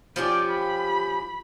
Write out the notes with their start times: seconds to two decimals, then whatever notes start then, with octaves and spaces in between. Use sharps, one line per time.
0.16 F3 C#4 F4 G4 D5
0.50 B5